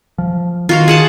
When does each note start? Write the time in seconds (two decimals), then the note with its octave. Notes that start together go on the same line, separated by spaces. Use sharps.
0.18 F3
0.69 D#3 F4 F#4 F5
0.88 G#4 F#5 A5